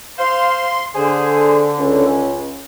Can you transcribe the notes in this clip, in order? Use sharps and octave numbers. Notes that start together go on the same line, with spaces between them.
C5 F5 C6
D3 G#4 C5
C#2 C#4